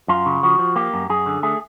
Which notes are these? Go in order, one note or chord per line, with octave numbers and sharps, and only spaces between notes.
F#2 F4
C#3
F3 F#4
F3
A#3 G4
F#2
F#2 G#4
D3
A3 G#4